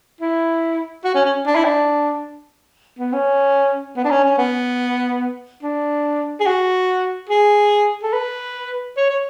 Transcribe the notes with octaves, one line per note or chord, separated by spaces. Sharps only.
E4
F#4
C#4
C#4
D4
E4
D4
B3
C#4
B3
D4
C#4
C#4
B3
D4
G#4
F#4
G#4
A4
B4
C#5
C#5